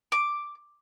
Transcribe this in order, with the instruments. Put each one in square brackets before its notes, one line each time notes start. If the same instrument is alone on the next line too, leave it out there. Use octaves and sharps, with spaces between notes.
[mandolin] D6